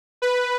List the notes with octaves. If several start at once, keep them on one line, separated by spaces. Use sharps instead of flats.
B4